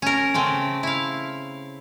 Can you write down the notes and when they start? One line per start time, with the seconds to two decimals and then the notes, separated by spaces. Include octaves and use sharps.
0.02 C#4 A#4
0.34 C#3 A3 C4
0.83 E4 F5